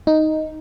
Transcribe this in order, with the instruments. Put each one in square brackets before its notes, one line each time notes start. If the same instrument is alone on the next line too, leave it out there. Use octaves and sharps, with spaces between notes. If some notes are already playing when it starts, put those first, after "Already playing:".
[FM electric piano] D#4